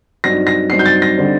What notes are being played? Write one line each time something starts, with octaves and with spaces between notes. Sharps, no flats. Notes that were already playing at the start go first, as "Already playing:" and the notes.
G2 F#3 C4 D#4 A#6
A#6
G2 F#3 C4 D#4 C7
G6
A6
A#6
D3 G3 C4 D#4